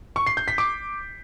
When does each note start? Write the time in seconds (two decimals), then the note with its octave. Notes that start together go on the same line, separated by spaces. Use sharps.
0.16 C#6
0.27 C7
0.37 G6
0.48 B6
0.58 D6